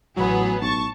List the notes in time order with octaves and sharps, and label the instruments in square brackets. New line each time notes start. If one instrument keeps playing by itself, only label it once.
[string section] A1 B3 G#4 [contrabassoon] F#3
[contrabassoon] B1 [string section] A5 C#6